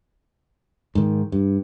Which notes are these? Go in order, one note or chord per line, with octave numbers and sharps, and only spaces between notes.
G#2 D#3
G2